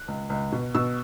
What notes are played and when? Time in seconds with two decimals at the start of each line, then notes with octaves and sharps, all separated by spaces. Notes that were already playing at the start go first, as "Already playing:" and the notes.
Already playing: F#6
0.08 C#2
0.30 C#2
0.52 B2
0.75 B2 E6